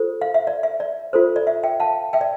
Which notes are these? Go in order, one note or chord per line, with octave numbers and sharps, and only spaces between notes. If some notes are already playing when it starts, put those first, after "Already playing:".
Already playing: F4 A4 C5
F5
E5
D5
E5
D5
F4 A4 C5
D5
E5
E5 G5
F5 A5
E5 G5
D5